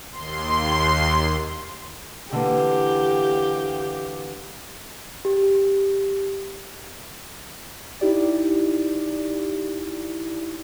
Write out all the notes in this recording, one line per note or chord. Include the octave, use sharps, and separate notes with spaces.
D#2 C6
D3 E3 A#3 G4
G4
D#4 E4 G4 D5